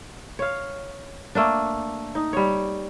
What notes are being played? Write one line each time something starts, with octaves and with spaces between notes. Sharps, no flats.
C#5 F5
A3 A#3 D4
D#4
G3 C#5